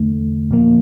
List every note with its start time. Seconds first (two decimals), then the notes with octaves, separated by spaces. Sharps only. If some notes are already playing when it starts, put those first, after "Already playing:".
Already playing: E2 D3 A3
0.51 A#2 F3 A#3